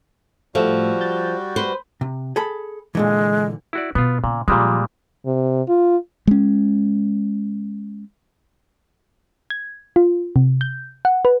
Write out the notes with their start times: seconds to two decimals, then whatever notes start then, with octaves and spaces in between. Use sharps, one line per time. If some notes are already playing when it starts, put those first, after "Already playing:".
0.55 A2 F3 G3 A3 F#4 E6
1.01 G6 A6
1.56 B4 C5
2.01 C3
2.36 G#4 A4 B5
2.95 A#2 D3 E3 G#3
3.73 E4 F#4 D5
3.95 B2 B3 F4
4.24 A#2 C#3
4.48 A#2 F3 G3 G#3
5.26 C3
5.69 F4
6.27 G#3 C#4
9.50 G#6
9.96 F4
10.36 C3
10.61 G6
11.05 F#5
11.25 B4